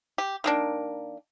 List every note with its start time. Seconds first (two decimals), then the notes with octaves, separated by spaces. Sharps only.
0.18 G4
0.44 D#3 A#3 D4